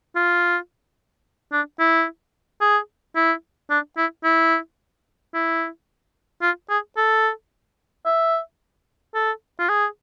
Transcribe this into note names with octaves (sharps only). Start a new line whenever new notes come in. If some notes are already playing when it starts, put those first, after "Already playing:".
F4
D4
E4
G#4
E4
D4
E4
E4
E4
F4
G#4
A4
E5
A4
F4
G#4